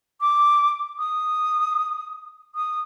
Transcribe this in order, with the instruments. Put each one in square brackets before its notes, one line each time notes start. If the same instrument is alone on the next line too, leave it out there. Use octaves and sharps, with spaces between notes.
[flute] D6
D#6
D#6